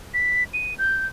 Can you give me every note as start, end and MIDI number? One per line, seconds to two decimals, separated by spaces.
0.14 0.44 95
0.54 0.74 99
0.79 1.07 91